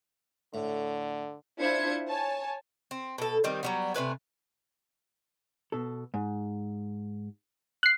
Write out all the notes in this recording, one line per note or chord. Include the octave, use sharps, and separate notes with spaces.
A2 D3
D4 E4 F4 C5 G#6 C#7
C#5 G#5 A5
C4
B2 A4
D#3 G3 C4
F#3 G3 B3
C3 A3 B4 G#5
B2 A4
G#2
F#6 C7